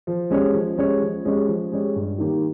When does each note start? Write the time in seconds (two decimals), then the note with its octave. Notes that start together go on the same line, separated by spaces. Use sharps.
0.07 F3
0.30 G#3 C#4 G4 C#5
0.54 F3
0.78 G#3 C#4 G4 C#5
1.01 F3
1.25 G#3 C#4 G4 C#5
1.48 F3
1.72 G#3 C#4 G4 C#5
1.95 G2
2.18 D#3 A#3 D#4 G4